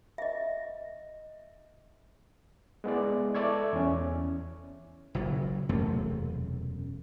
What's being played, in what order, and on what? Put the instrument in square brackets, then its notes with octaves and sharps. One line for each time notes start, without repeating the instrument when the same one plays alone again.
[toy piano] D#5 E5
[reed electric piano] G#3 B3 E4 D5
A4 D5 E5 C#6 G#6
E2 C#4
[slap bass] F#1 A#2 F#3
E1 F#2 C3 A3